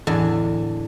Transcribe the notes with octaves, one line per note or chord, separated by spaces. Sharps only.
E2 A2 D3 F#5 G#5 A5